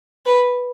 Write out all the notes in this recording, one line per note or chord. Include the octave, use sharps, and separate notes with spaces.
B4